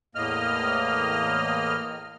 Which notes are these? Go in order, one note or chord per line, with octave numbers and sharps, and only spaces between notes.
E2 A2 A#3 D#5 F6